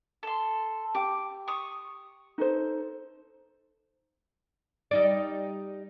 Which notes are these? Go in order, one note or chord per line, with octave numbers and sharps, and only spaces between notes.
A4 C6
G4 G5 D6
C#6 D#6
D#4 A4 C5
G3 D#4 D5